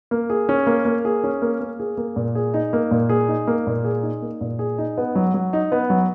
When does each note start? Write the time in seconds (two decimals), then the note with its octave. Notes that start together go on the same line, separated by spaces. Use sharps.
0.11 A#3
0.30 G#4
0.49 C#4
0.67 A#3
0.85 A#3
1.05 G#4
1.24 C#4
1.42 A#3
1.60 A#3
1.80 G#4
1.97 A#3
2.16 A#2
2.35 G#4
2.54 D#4
2.73 A#3
2.91 A#2
3.09 G#4
3.28 D#4
3.47 A#3
3.67 A#2
3.84 G#4
4.03 D#4
4.22 A#3
4.41 A#2
4.59 G#4
4.78 D#4
4.98 B3
5.15 F#3
5.34 F#3
5.53 D#4
5.72 B3
5.90 F#3